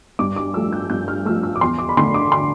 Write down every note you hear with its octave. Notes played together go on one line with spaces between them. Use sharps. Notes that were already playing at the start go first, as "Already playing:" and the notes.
G2 D6
D6
F3 A3 E6
G6
G2 G6
F6
F3 A3 E6
E6
D6
E2 C6
D6
B5
D3 A3 C6
D6
C6